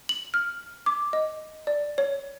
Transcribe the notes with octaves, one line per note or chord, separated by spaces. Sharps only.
F#7
F6
D6
D#5
D5
C#5